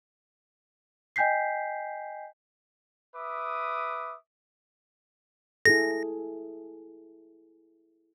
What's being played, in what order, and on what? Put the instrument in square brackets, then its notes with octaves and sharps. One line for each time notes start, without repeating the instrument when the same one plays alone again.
[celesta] D#5 G5 G#5 G6 B6 C7
[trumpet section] B4 E5 D6 D#6
[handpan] E4 G#4 A4 [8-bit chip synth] A#6